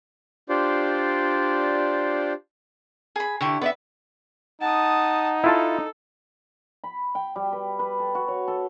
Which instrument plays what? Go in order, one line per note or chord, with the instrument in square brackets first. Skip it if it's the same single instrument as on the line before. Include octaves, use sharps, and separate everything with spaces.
[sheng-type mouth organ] D4 F4 G4 C5 D5
[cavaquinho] G#4 B5
[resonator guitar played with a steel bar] D3 [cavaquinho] E4 G4 C#6
[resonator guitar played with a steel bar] B3 D5 E5 [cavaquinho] B4
[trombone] D#4 [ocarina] F#5 [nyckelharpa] A5 D#6
[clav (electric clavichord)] E4 F4 A5 [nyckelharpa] A4
[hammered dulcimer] B5
G5
G3
B4
B4
A4
F#4
C#5
A4